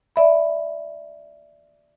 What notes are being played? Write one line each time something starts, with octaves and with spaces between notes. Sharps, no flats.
D5 E5 B5